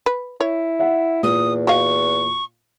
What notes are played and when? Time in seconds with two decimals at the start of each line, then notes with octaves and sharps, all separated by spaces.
0.06 B4
0.41 E4 C#5
0.79 E5 F#5
1.23 E2 A#2 D#6
1.67 F#4 D#5 F5 C#6